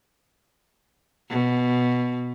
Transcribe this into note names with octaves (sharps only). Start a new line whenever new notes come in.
B2